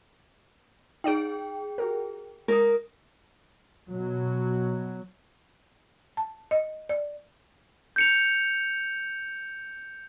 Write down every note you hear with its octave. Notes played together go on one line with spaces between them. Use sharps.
D#4 G#4 D5 G5 D7
F#4 G4 A#4
G#3 A#4 A#5 D#6
B2 F#3
A5
D#5
D5
G6 C#7 F7